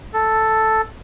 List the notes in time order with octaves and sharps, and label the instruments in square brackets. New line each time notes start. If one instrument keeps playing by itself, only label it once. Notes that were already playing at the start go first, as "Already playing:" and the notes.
[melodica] A4